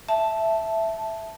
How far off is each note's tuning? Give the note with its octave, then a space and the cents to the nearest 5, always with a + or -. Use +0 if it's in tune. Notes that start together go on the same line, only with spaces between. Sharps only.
E5 +0 A5 -5